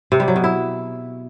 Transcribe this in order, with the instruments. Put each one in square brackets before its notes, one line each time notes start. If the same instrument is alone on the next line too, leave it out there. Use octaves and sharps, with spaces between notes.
[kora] C3
G3
F#3
B2
E4